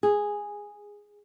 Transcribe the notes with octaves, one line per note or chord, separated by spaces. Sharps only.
G#4